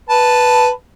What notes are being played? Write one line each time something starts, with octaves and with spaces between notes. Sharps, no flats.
B4 A5